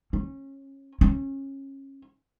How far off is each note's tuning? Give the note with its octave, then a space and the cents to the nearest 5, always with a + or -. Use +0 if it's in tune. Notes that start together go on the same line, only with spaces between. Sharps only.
C#4 -25
C#4 -25